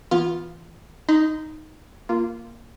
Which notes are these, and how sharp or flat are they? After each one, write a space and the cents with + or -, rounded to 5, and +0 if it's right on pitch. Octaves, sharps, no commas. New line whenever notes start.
E3 +0 B3 -20 F4 +5
D#4 +0 D#5 +0 C6 -45
A#3 +0 F4 -15